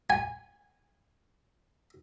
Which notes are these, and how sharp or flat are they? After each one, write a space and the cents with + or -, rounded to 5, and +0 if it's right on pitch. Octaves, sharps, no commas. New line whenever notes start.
G#5 -15